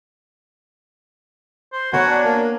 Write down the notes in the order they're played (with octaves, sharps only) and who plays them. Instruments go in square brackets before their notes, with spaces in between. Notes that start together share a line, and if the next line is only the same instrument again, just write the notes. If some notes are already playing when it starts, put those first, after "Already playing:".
[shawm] C5
[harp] B3 C#5 A#5 [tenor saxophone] F#4 [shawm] G#5
[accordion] D4
[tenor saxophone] A#3